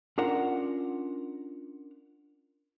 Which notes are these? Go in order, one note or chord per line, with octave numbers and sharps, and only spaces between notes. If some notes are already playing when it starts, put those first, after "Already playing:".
C#4 D4 F4 A#4 F#5